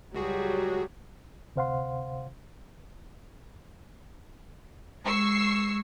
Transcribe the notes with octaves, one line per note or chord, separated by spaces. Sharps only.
C#2 F#3 G3 F#4 G#4
D2 C3 C5 F5 F#5 C6
G#3 C#6 E6 C7